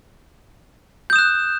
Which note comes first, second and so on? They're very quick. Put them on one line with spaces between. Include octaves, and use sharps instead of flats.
G6 D#6 E7 F#6